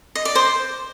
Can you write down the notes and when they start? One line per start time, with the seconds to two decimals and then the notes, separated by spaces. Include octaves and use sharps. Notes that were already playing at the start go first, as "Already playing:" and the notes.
0.15 D#5
0.25 D5
0.35 C5